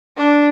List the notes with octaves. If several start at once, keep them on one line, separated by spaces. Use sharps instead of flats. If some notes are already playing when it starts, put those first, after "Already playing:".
D4